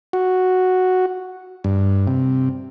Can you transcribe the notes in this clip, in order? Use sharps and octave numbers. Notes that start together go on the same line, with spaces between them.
F#4
G2
C3